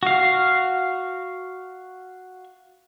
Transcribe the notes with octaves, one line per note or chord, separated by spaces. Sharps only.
F#4 F5